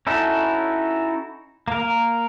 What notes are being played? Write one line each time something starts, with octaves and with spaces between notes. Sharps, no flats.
C#4 D#4 E4 F#4 A4
A#3 A#4